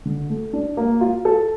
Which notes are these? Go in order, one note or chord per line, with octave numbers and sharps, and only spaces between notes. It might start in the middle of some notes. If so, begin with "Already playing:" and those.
D3
A3
D4
A#3
F4
A4